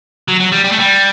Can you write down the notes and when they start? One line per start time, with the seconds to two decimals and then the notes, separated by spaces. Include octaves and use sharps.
0.28 F#3
0.40 F#3
0.52 G3
0.64 G3
0.72 A3
0.79 G3